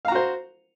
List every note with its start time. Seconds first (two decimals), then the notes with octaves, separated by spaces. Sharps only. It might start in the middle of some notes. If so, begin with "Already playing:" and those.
0.05 F5
0.08 A#5
0.12 F#4
0.15 C5